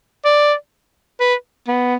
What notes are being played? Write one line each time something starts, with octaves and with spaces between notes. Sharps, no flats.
D5
B4
B3